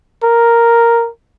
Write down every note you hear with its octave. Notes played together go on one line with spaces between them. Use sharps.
A#4